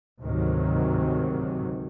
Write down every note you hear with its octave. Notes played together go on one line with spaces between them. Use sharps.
D2 G#2 C3 D#3 F#3